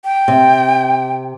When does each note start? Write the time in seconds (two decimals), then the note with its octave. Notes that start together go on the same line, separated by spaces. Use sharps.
0.05 G5
0.28 C3